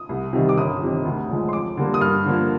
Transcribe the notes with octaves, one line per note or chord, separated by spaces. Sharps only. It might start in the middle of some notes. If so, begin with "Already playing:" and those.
Already playing: D#6
C2
C3 D#3 G3
D6
G1 D#6
F2 C3 D#3
D2
D3 F3 G#3
C6
F2 D6
D3 G3 A#3
D#6
G2 F6
D3 F3 A#3